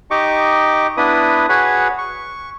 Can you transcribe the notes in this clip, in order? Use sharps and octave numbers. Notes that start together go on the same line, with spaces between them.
D#4 G4 D#5 C#6 D6
B3 D4 E4 B4 D#6
F#4 G#4 B4 C#5 F#5
C#6